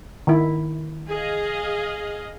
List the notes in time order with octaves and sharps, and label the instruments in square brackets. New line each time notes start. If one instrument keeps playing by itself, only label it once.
[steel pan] D#3 E4
[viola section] G#4 D#5 F5